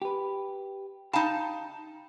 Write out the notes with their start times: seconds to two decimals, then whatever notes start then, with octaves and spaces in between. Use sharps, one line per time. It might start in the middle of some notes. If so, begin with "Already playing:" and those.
0.02 G4 B4
1.13 D#4 F5 G5 A5 B5